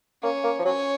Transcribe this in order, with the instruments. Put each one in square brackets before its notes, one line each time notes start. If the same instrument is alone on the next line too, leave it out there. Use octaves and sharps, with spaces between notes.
[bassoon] A#3 [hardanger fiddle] C#4
[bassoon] A#3
F3
[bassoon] F#3 [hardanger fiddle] C#4